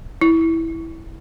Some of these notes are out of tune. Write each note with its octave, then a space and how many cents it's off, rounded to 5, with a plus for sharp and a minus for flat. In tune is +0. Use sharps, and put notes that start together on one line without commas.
E4 -10